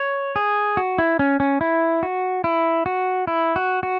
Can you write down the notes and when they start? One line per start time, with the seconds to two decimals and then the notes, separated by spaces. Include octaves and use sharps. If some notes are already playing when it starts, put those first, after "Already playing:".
Already playing: C#5
0.36 G#4
0.77 F#4
0.98 E4
1.19 C#4
1.40 C#4
1.61 E4
2.03 F#4
2.44 E4
2.86 F#4
3.27 E4
3.56 F#4
3.83 F#4